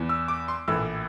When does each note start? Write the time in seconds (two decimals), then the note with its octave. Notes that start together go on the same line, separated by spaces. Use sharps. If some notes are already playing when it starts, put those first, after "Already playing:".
Already playing: E2 E3
0.09 E6
0.28 D6
0.48 C6
0.68 A#1 A2 E3 E6